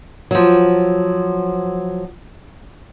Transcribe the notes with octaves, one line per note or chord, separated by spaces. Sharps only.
F3 F#3